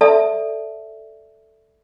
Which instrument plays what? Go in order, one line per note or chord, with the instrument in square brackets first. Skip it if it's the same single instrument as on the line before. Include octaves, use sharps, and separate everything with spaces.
[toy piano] A4 D5 E5 A5